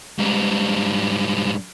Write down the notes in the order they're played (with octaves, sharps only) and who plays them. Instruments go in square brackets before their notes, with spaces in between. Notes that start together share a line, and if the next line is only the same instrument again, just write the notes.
[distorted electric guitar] G#2 G3